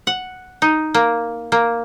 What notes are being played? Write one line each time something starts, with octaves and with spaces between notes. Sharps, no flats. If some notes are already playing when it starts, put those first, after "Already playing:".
F#5
D#4
A#3
A#3